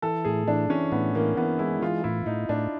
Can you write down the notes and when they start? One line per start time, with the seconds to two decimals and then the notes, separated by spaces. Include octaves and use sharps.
0.02 E3 A4
0.24 A2 G#4
0.48 E3 D4
0.70 E3 C#4
0.92 A2 B3
1.15 E3 A#3
1.37 E3 B3
1.59 G#3 E4
1.82 E3 F4
2.04 A2 E4
2.26 A2 D#4
2.49 A2 D4